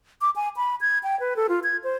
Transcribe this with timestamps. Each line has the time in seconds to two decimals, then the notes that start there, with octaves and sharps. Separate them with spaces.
0.21 D6
0.36 G#5
0.57 B5
0.81 G#6
1.03 G5
1.20 B4
1.36 A4
1.49 F4
1.64 G#6
1.84 C5